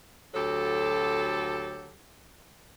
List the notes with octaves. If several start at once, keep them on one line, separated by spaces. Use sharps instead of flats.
D2 F#3 G4 A4